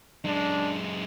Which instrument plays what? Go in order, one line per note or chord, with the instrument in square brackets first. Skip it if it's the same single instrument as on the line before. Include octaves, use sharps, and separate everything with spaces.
[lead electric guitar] F#2 G#3 [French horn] D4